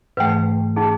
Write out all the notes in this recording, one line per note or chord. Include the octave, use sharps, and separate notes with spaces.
G#2 E3 A3 B4 G5
D#4 G#4